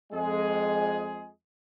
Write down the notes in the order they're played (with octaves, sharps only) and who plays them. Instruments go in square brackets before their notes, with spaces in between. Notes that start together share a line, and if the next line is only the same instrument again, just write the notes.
[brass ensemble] F2 G#3 G#4